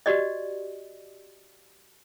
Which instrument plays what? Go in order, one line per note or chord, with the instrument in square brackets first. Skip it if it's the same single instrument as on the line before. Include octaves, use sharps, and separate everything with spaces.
[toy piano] F#4 G4 D5 D#5